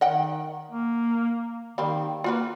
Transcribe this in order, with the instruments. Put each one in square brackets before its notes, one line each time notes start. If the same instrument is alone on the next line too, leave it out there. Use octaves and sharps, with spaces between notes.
[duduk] D#3 [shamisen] D#5 F#5 G5
[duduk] A#3
[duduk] D#3 [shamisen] G3 A#3 C4
[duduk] A#3 [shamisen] F4 F#4 B4